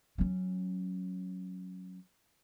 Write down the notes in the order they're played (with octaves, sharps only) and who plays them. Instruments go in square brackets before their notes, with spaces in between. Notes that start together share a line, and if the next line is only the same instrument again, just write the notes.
[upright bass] F#3 C#4